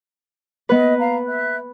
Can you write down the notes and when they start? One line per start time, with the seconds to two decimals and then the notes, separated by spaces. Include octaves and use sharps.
0.69 B3 B4 D#5
0.99 F5 A#5
1.27 E5 F#6